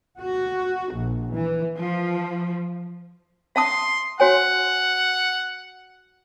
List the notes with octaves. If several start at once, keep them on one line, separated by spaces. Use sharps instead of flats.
F#4
A#1
E3
F3
E5 A5 C6 D#6
F#4 C#5 F#5 G#5